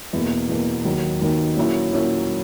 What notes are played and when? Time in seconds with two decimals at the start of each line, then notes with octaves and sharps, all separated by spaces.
0.13 E2 B2 A#3
0.49 E2 B2 A#3
0.85 D#2 D#3 F#3
1.22 D#2 D#3 F#3
1.56 A#2 F#3 A#3 C#4 E4
1.93 A#2 F#3 A#3 C#4 E4